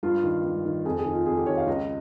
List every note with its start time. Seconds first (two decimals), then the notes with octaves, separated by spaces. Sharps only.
0.03 G2 F4
0.23 D#3
0.44 G2
0.65 D#3
0.85 F2 G#4
0.99 G#4
1.05 D#3
1.13 F4
1.26 F2 G#4
1.37 G4
1.46 D#3 C#5
1.58 F5
1.67 C#2 D#5